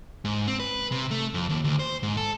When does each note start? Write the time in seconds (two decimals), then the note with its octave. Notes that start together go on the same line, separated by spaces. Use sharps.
0.25 G#2
0.48 C4
0.60 B4
0.92 C3
1.11 A3
1.34 F2
1.49 D#2
1.64 D2
1.79 C5
2.03 G#2
2.17 A4